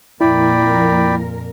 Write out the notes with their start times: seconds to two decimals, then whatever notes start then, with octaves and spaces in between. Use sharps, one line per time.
0.21 F2 A#2 E4 A#4 D5 G5 B5